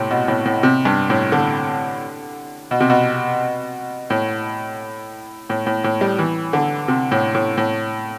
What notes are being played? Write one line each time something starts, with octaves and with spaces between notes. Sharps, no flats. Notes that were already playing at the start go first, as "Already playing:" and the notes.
Already playing: A2 C3
B2
A2
A2
C3
G2
A2
D3
B2
C3
B2
A2
A2
A2
A2
G3
E3
D3
C3
A2
A2
A2